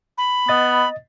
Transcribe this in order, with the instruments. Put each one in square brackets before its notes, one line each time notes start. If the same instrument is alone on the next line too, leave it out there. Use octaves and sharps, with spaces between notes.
[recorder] B5
[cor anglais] B3 [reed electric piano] D#5 A6